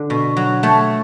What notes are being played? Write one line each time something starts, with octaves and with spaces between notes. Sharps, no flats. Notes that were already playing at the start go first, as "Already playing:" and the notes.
Already playing: D3
B2
F#3
A3 C#5